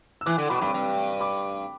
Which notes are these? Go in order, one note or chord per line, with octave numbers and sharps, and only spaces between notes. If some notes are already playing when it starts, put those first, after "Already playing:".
E6
E3 D6 F#6
D3
B2 B5 D6
G2 B5 D6
G2
B5 D6